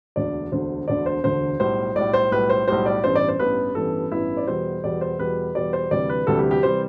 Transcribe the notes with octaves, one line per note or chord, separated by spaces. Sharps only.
E1 D2 D3 D5
E1 D2 D3 C5
E1 D2 D3 D5
C5
E1 D2 D3 C5
B1 A2 G3 C5
B1 A2 G3 D5
C5
B1 A2 G3 B4
C5
B1 A2 G3 C5
D5
A1 G2 E3 B3 C5
D5
C5
A1 G2 E3 B3 B4
A1 G2 E3 B3 A4
A1 G2 E3 B3 E4
D5
E2 B2 G3 C5
E2 B2 G3 D5
C5
E2 B2 G3 B4
E2 B2 G3 D5
C5
D2 C3 E3 G3 D5
B4
D2 C3 E3 G3 A4
G4
G4
C3 E3 G3 C5